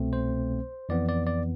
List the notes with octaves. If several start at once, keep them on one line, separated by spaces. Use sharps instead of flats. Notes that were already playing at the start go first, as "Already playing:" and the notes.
Already playing: C2 B2 A3 C4
C5
F2 E3 B3 D5
D5
D5